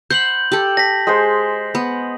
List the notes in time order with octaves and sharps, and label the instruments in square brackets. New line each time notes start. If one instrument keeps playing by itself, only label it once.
[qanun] C5 F#5 B5 [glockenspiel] G6 F#7
[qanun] G4 A4
[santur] A5 [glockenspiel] A#6 B6
[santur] G#3 G#4 C5
[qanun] B3